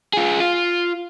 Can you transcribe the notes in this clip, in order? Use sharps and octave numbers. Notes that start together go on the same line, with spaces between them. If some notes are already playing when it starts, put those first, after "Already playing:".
F4 G#4
F4